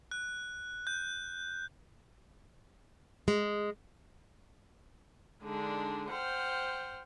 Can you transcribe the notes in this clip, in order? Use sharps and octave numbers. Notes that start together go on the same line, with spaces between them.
F#6
G6
G#3
D3 G#3 D4 D#4
C5 F#5 G5 F6